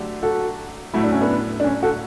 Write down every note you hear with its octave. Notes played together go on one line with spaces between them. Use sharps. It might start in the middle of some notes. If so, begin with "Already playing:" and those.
Already playing: D3 F#3 A3 D4 G4
F#4 A4
A2 F#3 A3 E4
D4
C#4
B3 D4
D4
C#4
F#4 A4